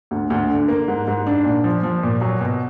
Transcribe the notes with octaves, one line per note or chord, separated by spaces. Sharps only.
D2
D2
D3
A#3
G#2
G#2
D4
A#2
F3
F3
A#2
F#3
B2